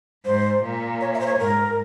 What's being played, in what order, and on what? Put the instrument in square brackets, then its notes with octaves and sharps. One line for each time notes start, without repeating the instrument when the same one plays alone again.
[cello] G#2 [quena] C5
[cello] A#2
[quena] C#5
E5
C5
C#5
[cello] G#2 [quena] A#4